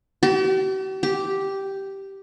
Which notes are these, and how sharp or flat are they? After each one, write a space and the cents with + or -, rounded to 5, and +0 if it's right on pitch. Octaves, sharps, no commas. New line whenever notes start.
G4 -45
G4 -5